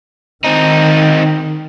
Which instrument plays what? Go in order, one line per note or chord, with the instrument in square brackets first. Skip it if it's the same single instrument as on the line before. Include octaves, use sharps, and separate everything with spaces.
[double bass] D#3 [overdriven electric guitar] C4 D#4